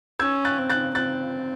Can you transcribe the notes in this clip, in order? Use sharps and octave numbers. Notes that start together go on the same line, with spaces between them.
C#4 E6 G#6
F#6 A6
C4
F#6 A6
C4 F#6 A6